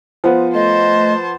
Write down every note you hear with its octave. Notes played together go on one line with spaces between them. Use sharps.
F3 B3 C5
A3 C5 D#5 A5